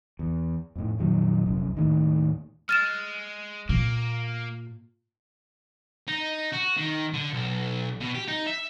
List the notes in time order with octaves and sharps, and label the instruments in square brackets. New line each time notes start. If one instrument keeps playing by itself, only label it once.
[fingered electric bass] E2
F2 A2
F2 A#2 D#3 F#3
F1 C2 F#2
D#2 A2 D#3
[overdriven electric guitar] G#3 [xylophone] F6 A6 E7
[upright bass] A#2 [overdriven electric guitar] A#3
[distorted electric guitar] D#4
F#4
D#3
D3
B1
B2
G4
D#4
E5